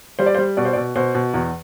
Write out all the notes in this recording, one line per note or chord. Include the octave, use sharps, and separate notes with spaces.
G3 C5
D5
C5
G3
B2 D5
C5
D5
B2
B2 C5
B2
E2